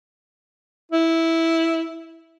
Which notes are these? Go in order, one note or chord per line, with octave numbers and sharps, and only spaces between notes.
E4